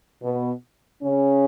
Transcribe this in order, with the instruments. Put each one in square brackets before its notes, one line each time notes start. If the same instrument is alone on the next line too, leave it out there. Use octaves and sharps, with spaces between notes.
[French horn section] B2 B3
C#3 C#4